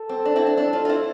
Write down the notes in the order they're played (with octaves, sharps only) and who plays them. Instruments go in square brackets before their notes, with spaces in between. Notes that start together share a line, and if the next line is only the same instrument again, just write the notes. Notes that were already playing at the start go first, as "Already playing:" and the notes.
Already playing: [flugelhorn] A4
[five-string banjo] C4
D4
C4 E4
D4
[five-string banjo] D4 [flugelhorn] A4
[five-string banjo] D4 F4
F4
C4 E4